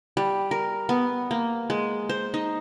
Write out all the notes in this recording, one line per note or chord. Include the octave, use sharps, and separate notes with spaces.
G3
A#4
B3
A#3
G#3
C5
D#4